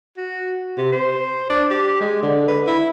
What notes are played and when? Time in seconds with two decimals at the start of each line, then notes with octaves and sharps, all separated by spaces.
0.17 F#4
0.78 C3
0.92 C5
1.49 D4
1.71 G4
2.01 G#3
2.23 D3
2.48 B4
2.67 E4